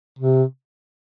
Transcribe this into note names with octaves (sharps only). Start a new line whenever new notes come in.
C3